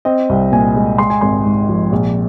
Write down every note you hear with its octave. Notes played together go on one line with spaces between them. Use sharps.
C4 D#5
C2
A#2 G#5
G#3
G#3 C6
G#5
G#1 C6
G#2
F3
A#1